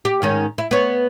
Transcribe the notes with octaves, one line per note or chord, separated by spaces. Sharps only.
G4
G#2 D#3 C#4
E4
B3 C#5